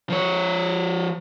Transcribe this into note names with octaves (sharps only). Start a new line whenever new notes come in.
F3 C#5